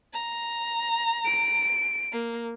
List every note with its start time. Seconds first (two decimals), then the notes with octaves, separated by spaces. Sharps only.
0.13 A#5
1.26 D7
2.13 A#3